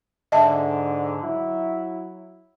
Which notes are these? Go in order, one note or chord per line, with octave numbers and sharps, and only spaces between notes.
G#2 D3 D#5 E5 A5
F#3 E4